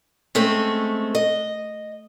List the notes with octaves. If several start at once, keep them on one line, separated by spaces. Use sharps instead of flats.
G#3 A3 C4 C#4 A4
D#5